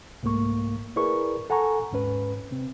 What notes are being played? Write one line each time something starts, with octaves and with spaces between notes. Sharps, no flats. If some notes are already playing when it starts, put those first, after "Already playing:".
C2 G#2 A3 A#3 C#6
E4 G#4 A#4 B4 D5 C#6
A4 F#5 G#5 A#5 C#6
D#2 G#2 C#4 B4
C3 C4